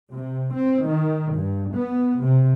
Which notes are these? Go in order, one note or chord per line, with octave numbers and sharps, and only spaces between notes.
C3
C4
D#3
G2
B3
C3